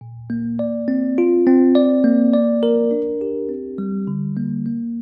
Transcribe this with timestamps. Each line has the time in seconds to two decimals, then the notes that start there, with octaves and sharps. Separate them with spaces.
0.01 A#2
0.30 A#3
0.59 D5
0.88 C4
1.18 F4
1.47 C4
1.75 D5
2.04 A#3
2.34 D5
2.63 A#4
2.91 D4
3.21 G4
3.49 C4
3.78 G3
4.07 D3
4.36 A#3
4.66 A#3